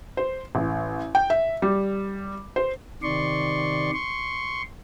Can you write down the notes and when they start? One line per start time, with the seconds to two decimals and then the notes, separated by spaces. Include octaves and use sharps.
0.17 C5
0.55 A1
1.15 G5
1.30 E5
1.62 G3
2.56 C5
3.03 C3 D#3 D5 C6 C#6
3.93 C6 C#6